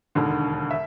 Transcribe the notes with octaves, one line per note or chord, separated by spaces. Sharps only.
E1 D#2 D3
E5